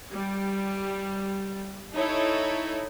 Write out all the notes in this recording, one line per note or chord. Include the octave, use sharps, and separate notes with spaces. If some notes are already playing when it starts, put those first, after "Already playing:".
G3
D#4 E4 A4 C#5